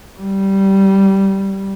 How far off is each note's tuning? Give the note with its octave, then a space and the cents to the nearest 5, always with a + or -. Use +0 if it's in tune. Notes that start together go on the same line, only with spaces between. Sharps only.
G3 -15